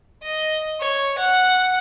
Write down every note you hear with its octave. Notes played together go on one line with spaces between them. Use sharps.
D#5
C#5
F#5